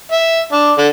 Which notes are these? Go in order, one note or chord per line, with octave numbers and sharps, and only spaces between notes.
E5
D4
D3